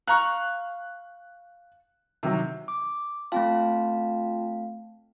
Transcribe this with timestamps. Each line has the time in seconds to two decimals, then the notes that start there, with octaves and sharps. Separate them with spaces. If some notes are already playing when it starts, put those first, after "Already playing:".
0.08 F5 A#5 C#6 F#6
2.23 C3 D#3 F#3
2.68 D6
3.32 A3 C4 F4 F5 G5 A5